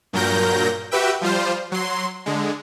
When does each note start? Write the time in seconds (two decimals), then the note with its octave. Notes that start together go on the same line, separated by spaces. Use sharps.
0.13 G2 A#2 F#3 A#4 G6 A#6
0.91 F#4 G4 B4 E5 G5
1.21 F3 G3 F4 C5
1.72 F#3 C6
2.26 D3 G#3